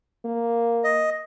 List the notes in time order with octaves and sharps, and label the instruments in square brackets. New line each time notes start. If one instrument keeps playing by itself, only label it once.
[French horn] A#3
[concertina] D#5